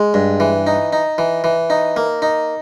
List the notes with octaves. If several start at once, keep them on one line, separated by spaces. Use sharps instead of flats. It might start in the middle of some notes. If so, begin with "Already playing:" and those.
Already playing: G#3
G2
E3
D#4
D#4
E3
E3
D#4
A#3
D#4